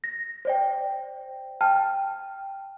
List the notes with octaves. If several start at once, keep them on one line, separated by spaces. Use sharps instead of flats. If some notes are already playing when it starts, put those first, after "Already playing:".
A#6
C5 D5 G5
G5 A5 F6